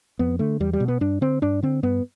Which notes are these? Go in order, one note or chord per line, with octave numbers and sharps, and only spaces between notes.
F2 B3
D3 A3
E2 G3
G3
B2
B3
G2 D4
D3 C4
G2 D4
D3 C4
G2 B3